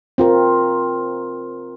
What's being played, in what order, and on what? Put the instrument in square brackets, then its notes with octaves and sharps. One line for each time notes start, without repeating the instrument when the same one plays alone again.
[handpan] C4 F4 A#4